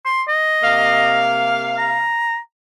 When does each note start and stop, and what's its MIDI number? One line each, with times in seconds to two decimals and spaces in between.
0.05 0.23 84
0.28 1.26 75
0.63 2.14 48
0.63 2.14 58
0.63 2.14 77
1.78 2.38 82